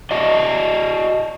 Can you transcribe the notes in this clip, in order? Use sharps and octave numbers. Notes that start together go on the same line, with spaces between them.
F#4 D5 D#5